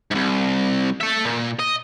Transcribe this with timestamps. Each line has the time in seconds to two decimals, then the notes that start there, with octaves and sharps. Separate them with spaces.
0.11 C2 G#2
1.01 A4 E5
1.25 A#2
1.59 D#5